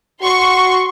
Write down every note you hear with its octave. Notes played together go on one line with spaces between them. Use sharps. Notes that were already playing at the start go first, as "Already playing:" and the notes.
F#4 C6 C#6